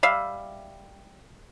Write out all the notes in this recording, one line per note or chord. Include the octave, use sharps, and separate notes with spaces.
G3 E5 F5